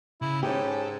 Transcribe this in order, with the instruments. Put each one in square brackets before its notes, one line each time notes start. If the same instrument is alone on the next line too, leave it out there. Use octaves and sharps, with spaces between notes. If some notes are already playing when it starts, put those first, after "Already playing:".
[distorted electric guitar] C#3 [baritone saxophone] E4
[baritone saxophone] G#2 [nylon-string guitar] C#4 G4 [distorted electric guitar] A4